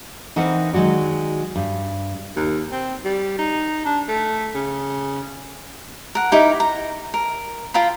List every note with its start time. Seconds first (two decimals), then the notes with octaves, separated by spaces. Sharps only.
0.36 E3 C4 D#4 A#4 B4 F#5
0.73 D#3 F#3 G#3 F#4 D5
1.56 G2
2.36 D#2
2.72 C4
3.05 G3
3.38 D#4
3.85 D4
4.09 A3
4.55 C#3
6.15 A#4 F#5
6.32 D#4 E4 G4 A#4
6.60 A#5
7.14 A#4
7.74 F4 G5 A#5 B5